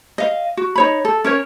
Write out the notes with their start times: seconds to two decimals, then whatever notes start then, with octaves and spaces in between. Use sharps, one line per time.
0.18 D#5 F5
0.57 F#4
0.76 D#4 C#5 B5
1.05 A4
1.24 C#4 A#4 C#5